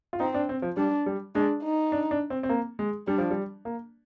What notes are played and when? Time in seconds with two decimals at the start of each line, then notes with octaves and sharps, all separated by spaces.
0.13 F4
0.20 C4 D#4
0.34 D4
0.49 C4
0.62 F3
0.77 G3 D4
1.06 G3
1.35 G#3 D4
1.63 D#4
1.92 D4
2.11 D4
2.30 C4
2.43 C4
2.49 A#3
2.79 G#3
3.07 G3 D4
3.18 F3
3.31 G3
3.65 A#3